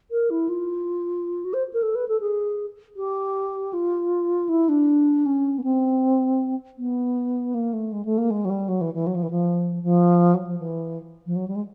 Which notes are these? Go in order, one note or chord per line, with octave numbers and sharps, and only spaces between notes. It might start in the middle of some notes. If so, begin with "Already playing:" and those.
A#4
E4
F4
F#4
C5
A#4
A4
B4
A4
G#4
G4
F4
E4
D4
C#4
B3
C4
B3
A#3
A3
G#3
A3
A#3
G#3
F#3
G3
F#3
E3
E3
F#3
F3
E3
F3
F3
F#3
F3
E3
F3
F#3
G3
G#3